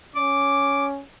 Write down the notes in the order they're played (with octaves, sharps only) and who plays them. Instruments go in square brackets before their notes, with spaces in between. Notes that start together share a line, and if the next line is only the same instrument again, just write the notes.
[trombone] C#4 [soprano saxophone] D6